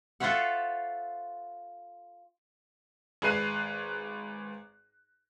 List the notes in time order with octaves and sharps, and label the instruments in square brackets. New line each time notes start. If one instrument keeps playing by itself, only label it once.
[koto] F4 A4 C5 C#5 E5 F#5
[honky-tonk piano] G#1 G#4 B4 F#6 C7 D#7